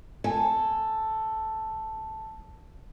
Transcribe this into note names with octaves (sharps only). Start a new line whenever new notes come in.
A4 G#5